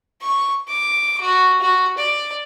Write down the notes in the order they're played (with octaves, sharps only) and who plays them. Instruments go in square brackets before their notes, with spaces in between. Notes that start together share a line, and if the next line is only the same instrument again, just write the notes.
[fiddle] C#6
D6
F#4
F#4
D5